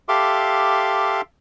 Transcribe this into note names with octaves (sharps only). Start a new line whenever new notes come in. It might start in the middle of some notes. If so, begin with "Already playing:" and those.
G4 A4 E5 F5 C6 D6